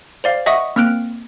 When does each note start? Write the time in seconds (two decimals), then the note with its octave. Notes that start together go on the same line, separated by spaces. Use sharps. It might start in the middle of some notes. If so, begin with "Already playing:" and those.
0.24 C5 D5 F5
0.46 D#5 E5 F#5 C#6 D#6
0.76 A#3 C4 F6 F#6 D7